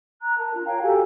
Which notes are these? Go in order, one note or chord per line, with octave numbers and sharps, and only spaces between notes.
A#5 F#6
A#4 A5
D4 F4
C#5 F5 G5 A#5
F#4 G4 A4 G#5